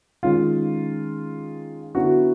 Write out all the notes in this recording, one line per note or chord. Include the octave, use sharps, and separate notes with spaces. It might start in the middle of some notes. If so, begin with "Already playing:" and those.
D#3 G#3 C#4 F4
D3 F#3 B3 E4 F#4